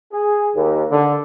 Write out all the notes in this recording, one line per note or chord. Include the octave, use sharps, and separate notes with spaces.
G#4
D#2
D3